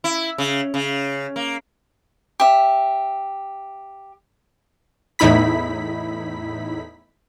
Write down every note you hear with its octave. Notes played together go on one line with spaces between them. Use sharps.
E4
C#3
C#3
A#3
G4 E5
E2 A2 D#4 E4 B5 B6